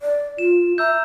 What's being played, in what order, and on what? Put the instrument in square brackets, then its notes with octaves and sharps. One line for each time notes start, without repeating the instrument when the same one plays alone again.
[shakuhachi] D5
[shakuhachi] F4 [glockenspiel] E7
[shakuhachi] E5 [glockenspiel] A#5 E6 G6